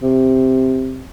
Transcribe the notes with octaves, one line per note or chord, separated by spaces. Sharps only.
C3